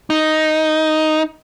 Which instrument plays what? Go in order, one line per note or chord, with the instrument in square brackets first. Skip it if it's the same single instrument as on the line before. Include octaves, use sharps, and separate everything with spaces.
[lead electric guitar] D#4